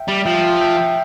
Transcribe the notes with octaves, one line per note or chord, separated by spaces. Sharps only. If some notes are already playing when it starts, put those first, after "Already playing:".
Already playing: E5 G5
G3
F3 E5 G5
E5 G5